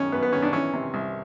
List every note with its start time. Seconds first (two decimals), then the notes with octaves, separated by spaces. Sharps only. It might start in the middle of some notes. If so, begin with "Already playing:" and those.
Already playing: F#2 D#3 C#4
0.12 F#2 B3
0.23 B3
0.33 D#3 C#4
0.43 D4
0.53 E3 C#4
0.73 C3
0.94 C2